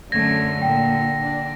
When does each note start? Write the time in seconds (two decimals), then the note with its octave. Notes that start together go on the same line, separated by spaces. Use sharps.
0.12 F#2 D3 A3 C#4 G#6 A#6
0.62 A#2 G5
1.22 D4